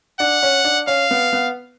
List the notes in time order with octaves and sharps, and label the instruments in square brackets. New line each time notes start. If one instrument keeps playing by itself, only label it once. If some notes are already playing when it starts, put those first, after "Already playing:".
[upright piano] D4 [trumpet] F#5
[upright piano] C#4
D4
[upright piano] C#4 [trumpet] F5
[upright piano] B3
B3